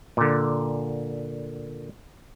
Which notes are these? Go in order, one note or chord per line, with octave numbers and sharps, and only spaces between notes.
A#2 D3